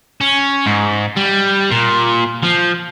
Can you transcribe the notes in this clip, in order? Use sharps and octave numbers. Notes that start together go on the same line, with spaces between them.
C#4
G#2
G3
A#2
F3